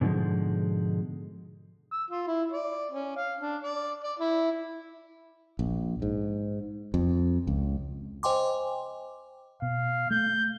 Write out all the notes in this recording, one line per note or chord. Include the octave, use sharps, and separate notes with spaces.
G#2 B2 D3 E3 F3 G#3
E6
F4
E4
D5
C#4
F5
D4
D5
D5
E4
A#1
G#2
F2
C#2
C5 D#5 G5 G#5 C6 D6
B2 F5
A3 G6